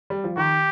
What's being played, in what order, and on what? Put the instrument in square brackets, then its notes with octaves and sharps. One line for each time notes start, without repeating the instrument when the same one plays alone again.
[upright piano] G3
F3
[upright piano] D#3 [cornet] G4